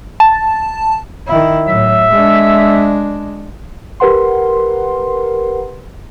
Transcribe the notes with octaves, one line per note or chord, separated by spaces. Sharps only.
A5
D#3 E4
A2 F#3 E5
G#3 D4
G4 A#4 B4 F#5 C6